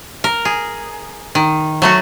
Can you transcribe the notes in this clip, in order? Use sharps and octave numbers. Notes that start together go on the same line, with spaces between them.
A#4
G#4
D#3
F#3 A3 F#4